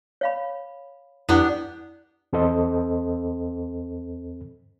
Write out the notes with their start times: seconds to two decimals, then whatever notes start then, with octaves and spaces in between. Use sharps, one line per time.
0.21 C#5 F5 B5
1.29 F2 B3 D4 E4 G4
2.33 E2 C4 A4 C5 D#5